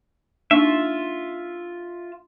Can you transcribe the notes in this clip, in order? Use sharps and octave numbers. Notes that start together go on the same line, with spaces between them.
A#3 D4 D#4 F4 E5